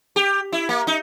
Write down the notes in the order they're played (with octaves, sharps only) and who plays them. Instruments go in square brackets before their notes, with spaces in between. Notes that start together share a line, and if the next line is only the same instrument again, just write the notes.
[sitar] G4
E4
A#3
D#4